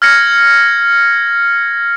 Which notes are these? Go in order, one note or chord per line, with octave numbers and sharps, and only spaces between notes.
F6 G#6 A#6 C#7